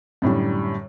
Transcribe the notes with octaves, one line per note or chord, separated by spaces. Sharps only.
F#2 A2 D3 G3